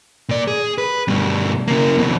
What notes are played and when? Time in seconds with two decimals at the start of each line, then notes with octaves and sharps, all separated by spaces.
0.29 A#2 D5
0.48 G#4
0.78 B4
1.08 G2 B2
1.68 C#3 A#3
1.97 F2 B2